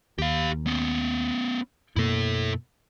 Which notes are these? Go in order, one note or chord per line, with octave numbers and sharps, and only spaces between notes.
D#2 G4 F5
B3 C#4
F#2 B2 A#3 E4 A4